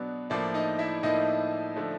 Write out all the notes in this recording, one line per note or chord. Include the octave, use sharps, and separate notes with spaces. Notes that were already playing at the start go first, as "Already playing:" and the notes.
Already playing: B2 F#3 B3 D4
A2 F3 A#3 D4 D5
D#4 D#5
E4 E5
A2 F3 A#3 D#4 D#5
D3 F3 A3